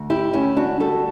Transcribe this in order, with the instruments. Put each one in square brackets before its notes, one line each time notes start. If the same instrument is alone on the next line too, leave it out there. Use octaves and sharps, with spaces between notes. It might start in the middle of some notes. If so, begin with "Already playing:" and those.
Already playing: [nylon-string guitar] D2
E4 G4
D2 C#4 E4
D4 F#4
G3 F#4 A4